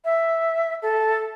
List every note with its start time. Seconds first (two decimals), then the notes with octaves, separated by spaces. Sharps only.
0.05 E5
0.82 A4